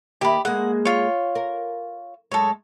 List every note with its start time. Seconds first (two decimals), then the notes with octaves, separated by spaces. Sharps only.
0.21 D#3 A#3 G4 E5 B5
0.45 G#3 A#3 G#4 F#5
0.85 F4 C#5
1.35 A#4
2.32 F#2 G#3 A4 C#5